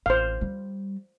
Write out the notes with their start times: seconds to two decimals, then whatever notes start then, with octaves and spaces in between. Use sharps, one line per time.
0.06 A1 C5 F5
0.41 G3